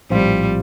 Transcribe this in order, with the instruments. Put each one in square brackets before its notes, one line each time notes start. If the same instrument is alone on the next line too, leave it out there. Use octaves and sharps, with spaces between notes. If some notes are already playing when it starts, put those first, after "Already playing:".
[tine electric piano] A#1 A2 F3 C4 F4 [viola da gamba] G3